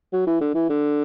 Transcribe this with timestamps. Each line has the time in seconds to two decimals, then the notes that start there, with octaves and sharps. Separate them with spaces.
0.13 F#3
0.27 E3
0.41 D3
0.54 E3
0.69 D3